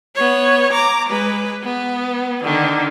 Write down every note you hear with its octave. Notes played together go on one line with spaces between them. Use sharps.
B3 C#5
A#5 D6
G#3 B4
B3
D3 D#3